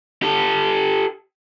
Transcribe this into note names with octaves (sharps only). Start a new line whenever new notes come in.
G4 A4